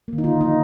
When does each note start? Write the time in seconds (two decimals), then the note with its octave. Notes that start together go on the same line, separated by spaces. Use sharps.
0.08 D#3 A#3
0.18 D#4
0.24 D3 F4
0.41 F3 A#3 D#4